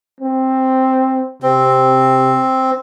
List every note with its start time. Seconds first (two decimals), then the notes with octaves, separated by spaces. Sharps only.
0.21 C4
1.42 C3 C4